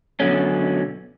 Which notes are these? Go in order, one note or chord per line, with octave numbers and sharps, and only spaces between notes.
F#2 B2 D3 C#4